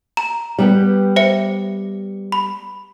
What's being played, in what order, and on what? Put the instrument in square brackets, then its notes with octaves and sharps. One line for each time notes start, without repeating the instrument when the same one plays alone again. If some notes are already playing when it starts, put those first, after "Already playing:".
[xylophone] A#5
[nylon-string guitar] G3 B3 G4
[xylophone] C5 E5 C#7
B5